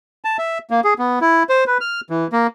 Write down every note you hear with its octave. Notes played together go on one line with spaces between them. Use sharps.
A5
E5
A#3
G#4
B3
E4
C5
B4
F6
E3
A#3